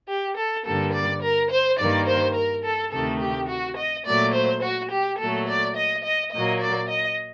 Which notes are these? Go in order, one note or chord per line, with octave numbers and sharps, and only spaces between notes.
G4
A4
G2 D3 G3 A#3 A4
D5
A#4
C5
G2 D#3 G3 A#3 D5
C5
A#4
A4
D2 C3 D#3 A3 A4
G4
F#4
D#5
A#2 F#3 A3 D5
C5
F#4
G4
A#2 F#3 A3 A4
D5
D#5
D#5
A#2 F#3 A#3 D#5
D5
D#5